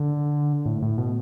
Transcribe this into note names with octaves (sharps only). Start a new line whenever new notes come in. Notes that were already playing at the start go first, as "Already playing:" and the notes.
Already playing: D3
A2
A2
B2